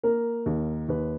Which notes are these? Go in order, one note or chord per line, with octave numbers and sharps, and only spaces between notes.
A#3 A#4
D#2
D#2 B4